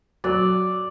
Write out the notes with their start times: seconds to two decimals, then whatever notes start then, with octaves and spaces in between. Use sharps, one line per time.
0.24 F#3 D5